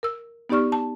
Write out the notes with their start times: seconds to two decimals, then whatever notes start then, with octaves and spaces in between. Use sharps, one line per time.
0.03 A#4 E6
0.49 B3 D#4 G4 D5 C#6 F6
0.72 A5